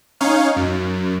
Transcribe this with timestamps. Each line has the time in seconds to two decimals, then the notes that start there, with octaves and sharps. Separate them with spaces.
0.21 C#4 D#4 C#5 F5
0.56 F#2